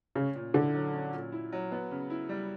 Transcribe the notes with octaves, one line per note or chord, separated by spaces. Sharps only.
C#3 C#4
A#2
D3 E4
F#3
C#4
A#2
E4
F#3
B3
C#3
E4
G3